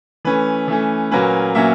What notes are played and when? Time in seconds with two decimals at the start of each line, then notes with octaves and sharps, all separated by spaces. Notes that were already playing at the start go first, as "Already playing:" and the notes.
0.25 E3 A3 C#4 B4
0.68 E3 A3 C#4
1.11 A#2 F#3 A#3 C#4 B4
1.55 A#2 F#3 A#3 C#4 E5